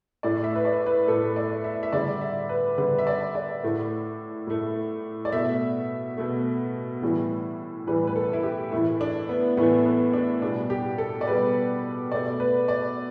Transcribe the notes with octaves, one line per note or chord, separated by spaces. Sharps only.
A2 A3 D5
E5
B4
D5
B4
A2 A3 A4
D5
E5
E5
D3 G3 D5
E5
B4
D3 G3 B4
E5
D5
D5
A2 A3
A2 A3
D5
B2 A3 E5
B2 A3
A2 E3 G3
A2 E3 G3 B4
B4
A4
E4
G4
A2 E3 A3 E4
D4
B3
A2 E3 A3 B3
B3
D4
B2 G3 D4
G4
A4
D5
B2 G3 B4
B2 A3 D5
B4
D5